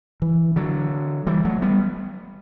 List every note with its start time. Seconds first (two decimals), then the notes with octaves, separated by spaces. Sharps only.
0.22 E3
0.56 D3 F#3
1.27 E3 G3
1.45 F#3 A3
1.62 G3 B3